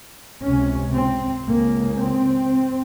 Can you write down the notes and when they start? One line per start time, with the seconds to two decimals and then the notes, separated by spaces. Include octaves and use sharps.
0.42 C#2 C3 C#4
0.94 C4
1.46 C#2 C#3 A#3
1.97 C4